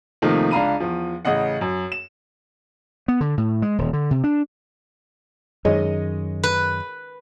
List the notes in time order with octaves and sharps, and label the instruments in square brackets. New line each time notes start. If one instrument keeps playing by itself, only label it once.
[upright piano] C3 D#3 F3 A3 A#3 D#4
C#2 D4 F5 A#5 B5 D#7
E2 F3
A1 C#3 D#5 F#5
F#2
E7
[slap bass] B3
D3
A2
G#3
D#1
D3
C3
D4
[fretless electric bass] F#2 D#3 [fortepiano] G#3 C#5 D#5
[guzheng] B4